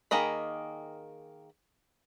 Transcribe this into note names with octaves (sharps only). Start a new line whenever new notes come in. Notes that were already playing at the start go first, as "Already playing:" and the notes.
D#3 A#3 G#4 D#5 B5